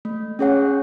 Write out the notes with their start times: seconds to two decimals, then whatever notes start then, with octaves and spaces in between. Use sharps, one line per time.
0.05 A3
0.39 C#4 G#4 C#5 F#5